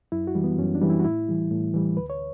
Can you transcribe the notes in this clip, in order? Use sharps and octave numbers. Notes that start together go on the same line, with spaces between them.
F#2 E4
F#4
E3 G3
B3
F#2 C#4
D4
E3 G3
E4
F#4
A2 E4
E3 G3
A2
E3 G3
D2 B4
C#5